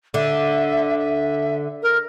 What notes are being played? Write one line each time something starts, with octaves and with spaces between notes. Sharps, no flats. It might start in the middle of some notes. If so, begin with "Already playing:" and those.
D3 E5
E5
A#4